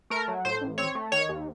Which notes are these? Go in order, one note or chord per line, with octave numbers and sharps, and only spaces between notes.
A3 A#4
F#3
A2 C5
A1
C4 C#5
A3
D#3 C#5
D#2